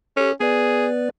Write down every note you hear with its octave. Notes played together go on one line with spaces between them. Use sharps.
C#4 G4 A4
B3 G#4 B4 D5